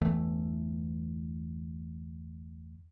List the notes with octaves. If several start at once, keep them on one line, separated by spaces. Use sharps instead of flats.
G1 E2 E3 A3